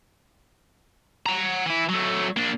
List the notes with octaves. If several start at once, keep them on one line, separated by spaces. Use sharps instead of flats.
F#5 A#5
E3 E4
F#3 A3
A#3 D4